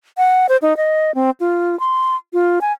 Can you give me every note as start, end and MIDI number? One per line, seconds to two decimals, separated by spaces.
0.18 0.47 78
0.49 0.57 72
0.62 0.76 63
0.77 1.14 75
1.15 1.30 60
1.40 1.78 65
1.80 2.15 84
2.33 2.59 65
2.61 2.73 80